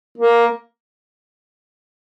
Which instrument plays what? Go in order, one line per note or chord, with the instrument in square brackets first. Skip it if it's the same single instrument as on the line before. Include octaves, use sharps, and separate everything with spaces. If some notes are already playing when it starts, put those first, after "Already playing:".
[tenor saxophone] A#3